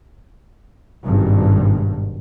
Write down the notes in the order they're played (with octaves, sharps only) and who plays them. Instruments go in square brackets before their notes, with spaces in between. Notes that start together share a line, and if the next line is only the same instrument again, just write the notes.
[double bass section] G#1 G2 B2